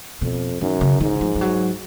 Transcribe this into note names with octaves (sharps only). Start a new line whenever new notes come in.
F2 B2
F#2 D#3
C#3
G#2 D#3
F3
F3
F#3